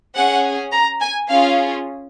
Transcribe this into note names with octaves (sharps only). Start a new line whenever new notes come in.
C#4 G#4 F#5
A#5
G#5
C#4 F4 G#4 F5